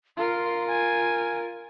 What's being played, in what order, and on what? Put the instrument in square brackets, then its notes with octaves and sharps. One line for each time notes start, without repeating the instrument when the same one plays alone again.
[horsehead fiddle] F4 A#4 [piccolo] C6
[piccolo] G#5